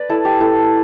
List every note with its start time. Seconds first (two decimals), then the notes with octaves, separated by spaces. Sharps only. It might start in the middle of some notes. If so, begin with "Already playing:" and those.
Already playing: B4 D5
0.09 E4 A4
0.25 G4
0.40 E4 A4